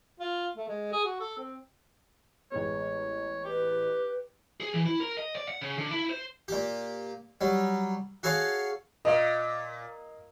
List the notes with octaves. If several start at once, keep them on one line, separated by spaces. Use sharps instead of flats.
F4
A3
G#3
G#4
F#4
A4
C4
A1 G#3 B3 C#5
G4 B4
G#4
E3
E4
A#4
D#5
D5
F#5
C#3
D3
E4
C5
A#2 G4
F#3 G3
F#4 G#4 A4 C#5 F5
A#2 D#5 F5